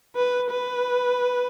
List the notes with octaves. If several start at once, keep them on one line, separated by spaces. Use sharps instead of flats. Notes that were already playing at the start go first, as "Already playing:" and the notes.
B4
B4